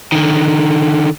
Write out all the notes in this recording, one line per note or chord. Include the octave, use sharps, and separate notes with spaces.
D3 D#3